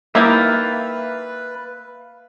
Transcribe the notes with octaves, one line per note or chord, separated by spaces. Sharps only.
A#3 D#4 E4 G4 B4 E5 F5 A5